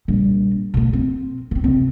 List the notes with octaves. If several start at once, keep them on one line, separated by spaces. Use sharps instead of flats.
A#1 G3
B2 A3
C4
E3 C4
C3 C4